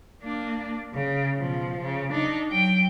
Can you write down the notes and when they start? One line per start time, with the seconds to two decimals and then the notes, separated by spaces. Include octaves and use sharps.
0.22 A#3 D4
0.94 C#3
1.38 B2 F3
1.80 C#3
2.09 D4 D#4
2.50 F#3 G5